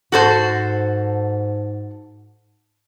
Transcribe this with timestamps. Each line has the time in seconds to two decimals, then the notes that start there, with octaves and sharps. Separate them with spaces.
0.12 G#2 F#4 A4 C5